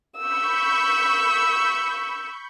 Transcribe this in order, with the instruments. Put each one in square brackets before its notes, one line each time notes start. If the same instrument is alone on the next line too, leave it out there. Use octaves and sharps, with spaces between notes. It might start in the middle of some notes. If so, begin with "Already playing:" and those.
[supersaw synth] B5 C#6 G6 [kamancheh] E6